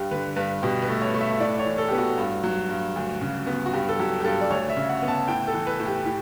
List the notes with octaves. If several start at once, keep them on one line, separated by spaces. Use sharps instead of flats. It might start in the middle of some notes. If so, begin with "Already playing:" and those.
Already playing: G2 G4
D3 B4
G2 B4
B2 G4
B4
A3
C#5
A3
E5
A2 D5
C#5
E3
A4
B3 G4
F#4
G2
F#3
G2
D2
C#3
B3
F#4
G2 G4
A4
F#3 G4
G4
G2 A4
D5
D2 C#5
E5
C#3
F#5
B3
A5
A2 G5
A4
E3
B4
A2
G4
A2 G4